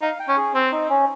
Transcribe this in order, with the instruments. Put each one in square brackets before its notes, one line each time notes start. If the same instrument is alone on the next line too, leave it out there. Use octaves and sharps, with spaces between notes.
[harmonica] D#4 [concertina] F5
[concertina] G5
[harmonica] C#4
[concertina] G#4
[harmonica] C4
[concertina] D#4
C#4